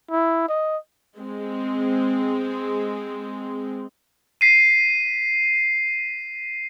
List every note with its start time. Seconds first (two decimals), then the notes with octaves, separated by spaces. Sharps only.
0.11 E4
0.49 D#5
1.18 G#3 C4
4.41 B6 C7 D#7